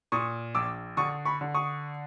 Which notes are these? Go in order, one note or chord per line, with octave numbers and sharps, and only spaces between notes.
A#2 C#6 D#6
A#1 D6 E6
D3 C#6 D#6
B5 C#6
D3
C#6 D#6